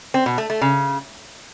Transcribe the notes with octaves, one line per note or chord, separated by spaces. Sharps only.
C4
B2
A3
A3
C#3